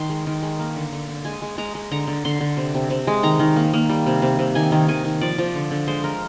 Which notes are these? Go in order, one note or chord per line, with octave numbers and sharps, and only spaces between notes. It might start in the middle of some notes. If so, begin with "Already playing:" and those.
Already playing: D#3 C6
G#3
D#3
G#3
A#3
D3
D3
D3
G#3 G#5
G#3
G#3 A#5
G#3
D3 A#5
D3
D3 C6
D3
C3
C3
C3
G#3
D#3 A#5
D#3
A#3
A#3
G3
C3
C3
C3
D#3 G#5
D#3
D#3 G#5
D#3
F3 D5
F3
D3
D3
G#3 C5
G#3 A#4